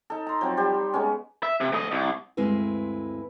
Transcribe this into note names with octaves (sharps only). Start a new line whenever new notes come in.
D#4 A4
A#5 C6
F3 F#3 C4
G3 G4 C5 G5
G5
G#3 B3 C#4
E5
C3
D2 D#5
C2
D2 G2 G#3 C4 E4 B4